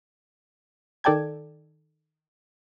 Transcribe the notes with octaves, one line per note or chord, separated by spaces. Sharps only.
D#3 A4 D5 G5 A5 G#6